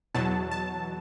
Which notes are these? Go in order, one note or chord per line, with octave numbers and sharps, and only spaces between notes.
E2 B2 F#3 A5
A5